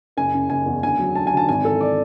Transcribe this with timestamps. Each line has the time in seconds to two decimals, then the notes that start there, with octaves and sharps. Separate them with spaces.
0.17 F#1 G#5
0.34 C#3
0.50 F#1 G#5
0.66 E2
0.82 D2 G#5
0.99 F#3
1.15 D2 A5
1.27 G#5
1.32 D3 A5
1.49 G#1 G#5
1.65 E3 A4
1.81 D5